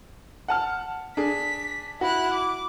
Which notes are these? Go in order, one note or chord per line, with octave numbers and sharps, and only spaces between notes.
F#5 A5 F6
D4 G#4 B6
E4 F#4 F#6
D6